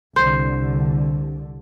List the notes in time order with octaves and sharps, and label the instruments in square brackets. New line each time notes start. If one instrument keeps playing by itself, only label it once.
[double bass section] C2 D3 [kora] C5